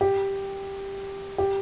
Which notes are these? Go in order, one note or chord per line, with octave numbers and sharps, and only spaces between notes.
G4
G4